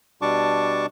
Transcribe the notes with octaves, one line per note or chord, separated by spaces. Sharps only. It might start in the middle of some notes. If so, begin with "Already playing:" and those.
B2 G3 D4 A5 C#6 D6